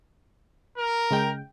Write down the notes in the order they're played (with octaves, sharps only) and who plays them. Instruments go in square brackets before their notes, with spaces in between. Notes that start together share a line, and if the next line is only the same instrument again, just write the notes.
[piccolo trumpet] A#4
[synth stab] C#3 G#3 G5